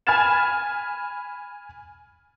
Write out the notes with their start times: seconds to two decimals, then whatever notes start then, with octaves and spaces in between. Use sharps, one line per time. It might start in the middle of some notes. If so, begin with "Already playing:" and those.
0.07 G#5 B5 F6 G#6 A6 E7